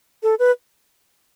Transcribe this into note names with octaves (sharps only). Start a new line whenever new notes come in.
A4
B4